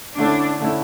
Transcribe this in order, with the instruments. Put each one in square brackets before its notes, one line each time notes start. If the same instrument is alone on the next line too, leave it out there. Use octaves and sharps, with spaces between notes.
[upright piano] D3 A3 C#4 E4 [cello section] D4
[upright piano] D3 A3 C#4 E4